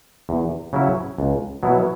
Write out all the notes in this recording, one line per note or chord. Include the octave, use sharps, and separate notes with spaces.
E2
C#3 F#3 C#4 E4
C#2
B2 F#3 B3 E4